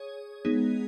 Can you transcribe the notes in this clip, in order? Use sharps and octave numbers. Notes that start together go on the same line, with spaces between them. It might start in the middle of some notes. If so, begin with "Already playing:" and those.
Already playing: G#4 C#5
G#3 B3 D#4 G#4